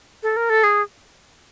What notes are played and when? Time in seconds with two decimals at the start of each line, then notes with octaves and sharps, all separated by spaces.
0.23 A4
0.37 A#4
0.50 A4
0.64 G#4